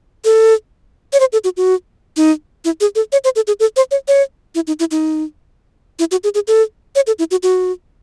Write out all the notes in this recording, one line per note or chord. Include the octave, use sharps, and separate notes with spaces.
A4
C#5
C5
A4
F#4
F#4
D#4
E4
G#4
A4
C#5
C5
A4
G#4
A4
C5
C#5
C#5
E4
D#4
E4
D#4
E4
F#4
G#4
G#4
A4
C#5
A4
E4
F#4
F#4